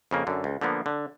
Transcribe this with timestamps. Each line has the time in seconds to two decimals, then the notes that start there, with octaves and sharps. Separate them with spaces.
0.11 F2 C#3 A#3
0.27 F#2 D3
0.44 C#2
0.61 D3 F3 A#3 B3
0.86 D3